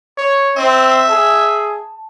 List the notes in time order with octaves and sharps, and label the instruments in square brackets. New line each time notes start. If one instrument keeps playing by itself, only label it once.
[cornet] C#5
[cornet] C4 [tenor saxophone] E5
[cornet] G#4 [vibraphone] A5